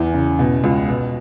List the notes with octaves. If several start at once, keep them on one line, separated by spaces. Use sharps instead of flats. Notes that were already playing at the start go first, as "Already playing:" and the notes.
Already playing: E2 E3
C#3
B2
C#2
B2